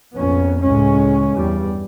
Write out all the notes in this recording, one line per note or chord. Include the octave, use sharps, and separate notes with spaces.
A#1 F2 B3 C#4
C#2 A2 G#3 C#4
E2 G2 G3